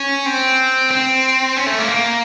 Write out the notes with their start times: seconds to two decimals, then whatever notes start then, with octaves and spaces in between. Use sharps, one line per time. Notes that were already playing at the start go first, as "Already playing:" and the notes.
Already playing: C#4
0.26 C4
0.91 C4
1.57 C#4
1.67 A3
1.78 A#3
1.89 A#3